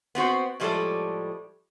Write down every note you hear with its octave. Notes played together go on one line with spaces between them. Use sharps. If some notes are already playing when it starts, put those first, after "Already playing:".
B3 C4 F#4 C5
A2 F3 G3 G#3 A4 D5